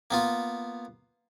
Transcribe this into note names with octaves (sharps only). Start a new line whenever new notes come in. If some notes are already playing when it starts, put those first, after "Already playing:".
A#3 B3 F4